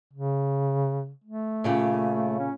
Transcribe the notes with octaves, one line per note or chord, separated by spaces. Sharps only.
C#3
A3
A#2 C#3 G4
C#4